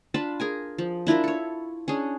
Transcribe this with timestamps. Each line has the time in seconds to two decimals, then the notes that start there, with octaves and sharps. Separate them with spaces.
0.14 D4 F4 A5 B5
0.40 G#4 A#4 G#5
0.78 F3
1.07 D4 E4 F4 A#4
1.24 A4 C#5
1.88 C#4 D4 G#4